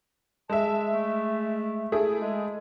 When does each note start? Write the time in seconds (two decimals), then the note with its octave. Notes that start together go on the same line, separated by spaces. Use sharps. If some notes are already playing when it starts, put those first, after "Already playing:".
0.50 G#3 E5 A5
0.93 A3
1.92 A3 E4 G#4
2.20 G#3